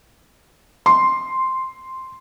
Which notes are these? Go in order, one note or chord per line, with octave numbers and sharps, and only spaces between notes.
C6